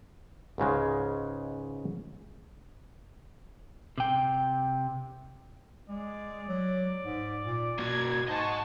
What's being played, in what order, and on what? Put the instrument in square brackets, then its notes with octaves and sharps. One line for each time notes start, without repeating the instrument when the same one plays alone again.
[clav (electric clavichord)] C#2 G#2 C#3 G#3
[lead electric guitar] C3 G5
[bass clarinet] G#3 [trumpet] D5
[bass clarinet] F#3
G#2
A#2
[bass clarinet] B2 [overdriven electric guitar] A#3 F#4 [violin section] G#6
[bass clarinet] G#2 [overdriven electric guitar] G#4 D#5 [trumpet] C5 [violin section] F#5 A5 C#6